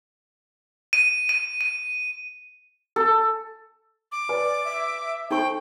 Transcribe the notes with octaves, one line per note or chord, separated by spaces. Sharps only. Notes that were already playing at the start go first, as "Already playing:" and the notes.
D#7
D#7
D#7
A4
D6
B4 D5 G#5
E5
D#4 A4 C5 G5 C#6